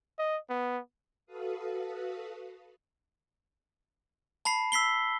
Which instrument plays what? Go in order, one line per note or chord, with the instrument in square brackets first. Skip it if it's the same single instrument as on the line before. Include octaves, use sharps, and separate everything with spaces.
[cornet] D#5
B3
[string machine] F#4 A4 B4 F5 D#6
[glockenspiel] A5 B5 C7
E6 B6 C7 G7